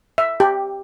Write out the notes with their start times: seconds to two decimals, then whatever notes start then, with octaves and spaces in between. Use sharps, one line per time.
0.18 E5
0.40 G4